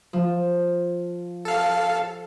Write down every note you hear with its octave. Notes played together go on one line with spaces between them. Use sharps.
F3
A4 F5